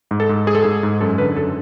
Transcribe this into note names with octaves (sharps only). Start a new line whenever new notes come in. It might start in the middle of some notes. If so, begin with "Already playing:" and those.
G#2
A4
G#2
G#2 G#4
A4
G#2 G#4
G#2
F#2 A4
D3 B4
F#2 A4